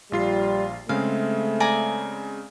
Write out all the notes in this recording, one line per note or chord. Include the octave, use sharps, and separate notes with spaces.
A#1 G3 F4 C7
C#3 G#3 A3 C4 F5
D5 G#5 A#5